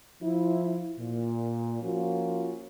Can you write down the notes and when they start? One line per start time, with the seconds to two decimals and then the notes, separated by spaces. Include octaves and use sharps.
0.22 F3 E4
0.99 A#2
1.83 F3 A#3 C#4 F4 F#4